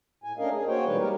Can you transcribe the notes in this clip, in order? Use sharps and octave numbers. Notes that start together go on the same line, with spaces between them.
A2 G#5
A3 C#4 D4 A#4 D#5 F5
G#4
A#3 F#4 C5 C#5 G5
B2 E3 G3 G#3 D#4 B4
G3 G#3 G4 A#4